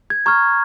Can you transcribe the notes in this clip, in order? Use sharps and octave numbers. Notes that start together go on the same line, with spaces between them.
G#6
A#5 C#6 F6 G#6